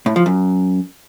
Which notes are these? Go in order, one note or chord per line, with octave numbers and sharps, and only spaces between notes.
A2
F3
F#2